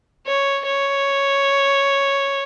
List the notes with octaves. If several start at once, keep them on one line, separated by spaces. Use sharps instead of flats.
C#5
C#5